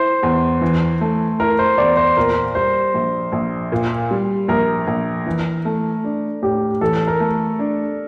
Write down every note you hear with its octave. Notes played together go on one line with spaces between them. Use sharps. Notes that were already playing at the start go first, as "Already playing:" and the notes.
Already playing: E4 C5
E2
E3
A3
E4 A#4
C5
E2 D5
C5
A#2 A#4
G3 C5
A#1
A#1
A#2
G3
A#1 A#4
A#1
E3
A3
D4
A2 G4
E3 A4
A#4
A3
D4